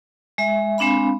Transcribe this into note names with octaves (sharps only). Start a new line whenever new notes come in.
G#3 E5
G#3 C4 D4 F5 B5